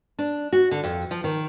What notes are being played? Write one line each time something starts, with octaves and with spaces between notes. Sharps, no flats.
D4
F#4
D3
F2
F3
D#3